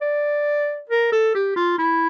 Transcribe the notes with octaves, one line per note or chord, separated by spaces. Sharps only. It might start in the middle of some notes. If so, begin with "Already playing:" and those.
D5
A#4
A4
G4
F4
E4